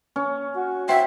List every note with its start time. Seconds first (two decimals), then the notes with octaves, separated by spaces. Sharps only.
0.16 C#4
0.55 F#4
0.89 C5 E5 G5